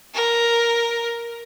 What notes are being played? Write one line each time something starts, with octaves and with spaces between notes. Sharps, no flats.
A#4